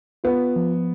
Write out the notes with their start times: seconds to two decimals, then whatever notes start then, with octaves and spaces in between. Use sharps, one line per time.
0.24 B3 F4
0.56 F3